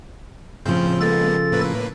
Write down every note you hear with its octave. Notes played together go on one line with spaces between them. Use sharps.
A2 C#3 F3 C4 G6
G#3 A#3 B3 A4 A6
A2 A#3 B4